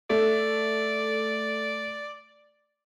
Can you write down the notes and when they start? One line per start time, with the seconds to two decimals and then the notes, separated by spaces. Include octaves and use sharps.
0.10 A3 D5